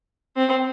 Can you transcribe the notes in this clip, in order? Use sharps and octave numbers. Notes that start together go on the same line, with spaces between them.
C4